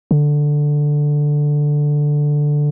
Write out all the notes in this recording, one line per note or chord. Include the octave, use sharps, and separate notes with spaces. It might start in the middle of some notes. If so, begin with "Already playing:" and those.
D3